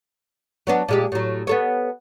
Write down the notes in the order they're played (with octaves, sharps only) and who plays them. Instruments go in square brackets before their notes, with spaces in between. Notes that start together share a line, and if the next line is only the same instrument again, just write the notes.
[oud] F#3 B3 D4
A#2 G#3 G4
A2 F#3
B3 A4 C#5